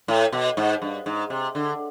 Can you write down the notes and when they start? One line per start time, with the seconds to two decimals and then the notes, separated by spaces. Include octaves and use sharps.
0.08 A2
0.32 B2
0.57 G#2
0.82 G2
1.06 G#2
1.30 C3
1.55 D3